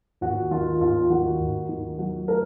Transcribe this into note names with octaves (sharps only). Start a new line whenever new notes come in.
D#2 F#4
D#3 F4
D#2 F4
D#3 F#4
D#2
D#3
F#3 F#4
A3 A#4